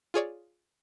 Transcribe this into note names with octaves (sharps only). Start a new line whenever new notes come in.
F4 G#4 C#5 D5